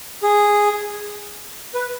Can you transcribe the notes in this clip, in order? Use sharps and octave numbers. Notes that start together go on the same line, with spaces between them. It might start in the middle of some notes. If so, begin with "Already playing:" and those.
G#4
B4